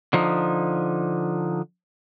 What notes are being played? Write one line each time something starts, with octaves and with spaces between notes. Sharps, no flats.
D3 F3 D#4